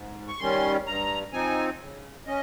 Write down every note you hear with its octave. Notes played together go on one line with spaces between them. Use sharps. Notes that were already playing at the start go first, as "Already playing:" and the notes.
Already playing: G#2
C#6
D#3 G3 C#4 C6
G2 A#5
F3 C4 D#4 G#5
C#3
C#4 D#5